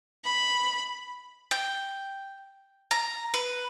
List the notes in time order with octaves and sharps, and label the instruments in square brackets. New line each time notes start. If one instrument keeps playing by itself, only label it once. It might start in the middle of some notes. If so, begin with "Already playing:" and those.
[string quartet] B5
[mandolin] G5
A#5
B4